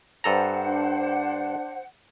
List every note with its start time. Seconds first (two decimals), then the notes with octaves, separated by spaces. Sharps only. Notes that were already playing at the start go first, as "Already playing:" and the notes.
0.24 G2 A4 C5 F#5 A#5
0.67 D4